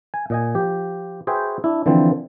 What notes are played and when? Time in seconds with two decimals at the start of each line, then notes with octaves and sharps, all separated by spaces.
0.14 G#5
0.30 A#2 D#5 G#5
0.55 F3 G4
1.27 F#4 G#4 B4 C5 E5 G5
1.64 D4 E4
1.86 D3 E3 F3 C4